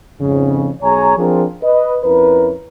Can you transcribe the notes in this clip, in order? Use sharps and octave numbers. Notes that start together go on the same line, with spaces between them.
F2 G#2 C#3
B1 G#4 C#5 G#5 A#5
F3 C4 D4 F4 G#4 A#4
B4 D#5
F2 C#4 E4 A#4 B4